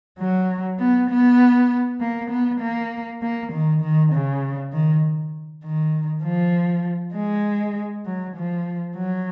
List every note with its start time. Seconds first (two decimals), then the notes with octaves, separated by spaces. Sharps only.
0.19 F#3
0.79 B3
1.10 B3
2.01 A#3
2.30 B3
2.60 A#3
3.22 A#3
3.52 D#3
3.81 D#3
4.13 C#3
4.73 D#3
5.64 D#3
6.24 F3
7.15 G#3
8.06 F#3
8.36 F3
8.96 F#3